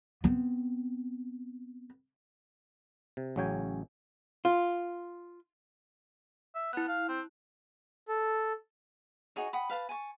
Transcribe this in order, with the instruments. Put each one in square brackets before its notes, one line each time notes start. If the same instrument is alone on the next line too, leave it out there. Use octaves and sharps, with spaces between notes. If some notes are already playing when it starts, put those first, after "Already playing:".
[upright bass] B3 C4
[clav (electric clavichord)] C3
A1 C#3 F#3 C#4 G5 G#5
[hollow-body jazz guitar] F4
[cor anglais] E5
[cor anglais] B3 [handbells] E4 F#6
[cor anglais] F5
C4
[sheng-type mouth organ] A4
[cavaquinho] D#4 F#4 G#4 C#5
F#5 G5 B5 D#6
B4 F5 A5 B5
G#5 A5 C#6